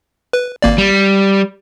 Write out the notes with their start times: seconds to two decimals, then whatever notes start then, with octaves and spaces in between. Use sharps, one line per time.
0.33 B4
0.62 G#1 A#3 D5
0.78 G3